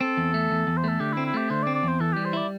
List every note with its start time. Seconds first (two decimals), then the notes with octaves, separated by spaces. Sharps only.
0.01 C4 A4
0.17 E2
0.34 A3
0.51 E2
0.67 E2
0.77 C5
0.84 A3 A4
1.00 D3 G4
1.13 C4 E4
1.26 E4
1.34 A3 G4
1.50 D3 C5
1.63 D5
1.67 C4
1.75 D5
1.83 E2 C5
2.00 E3 A4
2.13 G3 G4
2.25 C5
2.33 E4 D5